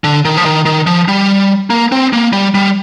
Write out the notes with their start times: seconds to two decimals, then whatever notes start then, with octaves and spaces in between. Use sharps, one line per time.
0.04 D3
0.25 D#3
0.37 F3
0.46 D#3
0.66 D#3
0.87 F3
1.08 G3
1.70 A#3
1.92 C4
2.13 A#3
2.33 G3
2.55 G3